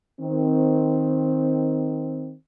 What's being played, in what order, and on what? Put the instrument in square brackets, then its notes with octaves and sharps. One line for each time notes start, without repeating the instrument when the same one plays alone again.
[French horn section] D#3 C4